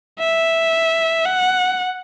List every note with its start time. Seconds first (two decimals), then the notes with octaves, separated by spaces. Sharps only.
0.19 E5
1.26 F#5